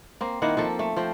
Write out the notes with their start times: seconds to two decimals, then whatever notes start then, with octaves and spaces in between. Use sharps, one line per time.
0.21 A#3 C4
0.42 D#3 A#3 E4 F#5
0.57 F3 A#3 A4
0.79 A3
0.96 F3 C4 G5